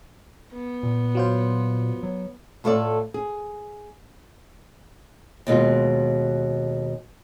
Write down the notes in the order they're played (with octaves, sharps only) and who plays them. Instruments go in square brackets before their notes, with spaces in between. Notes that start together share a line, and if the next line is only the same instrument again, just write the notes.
[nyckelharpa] B3
[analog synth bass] A#2
[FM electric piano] F#3 F4 C5
[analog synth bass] F#3
[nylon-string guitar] A2 A3 F4 A4 D5
G#4
D#2 B2 G#3 F4